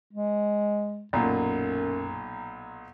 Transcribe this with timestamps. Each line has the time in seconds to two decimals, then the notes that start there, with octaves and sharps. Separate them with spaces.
0.13 G#3
1.13 B1 F#2 A#2